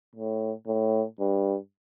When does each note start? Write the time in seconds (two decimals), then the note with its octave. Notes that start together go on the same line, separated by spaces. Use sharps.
0.15 A2
0.67 A2
1.20 G2